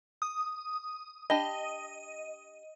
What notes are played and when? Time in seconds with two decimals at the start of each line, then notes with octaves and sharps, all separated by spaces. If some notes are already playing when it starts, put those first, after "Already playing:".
0.22 D#6
1.30 D4 G4 D#5 B5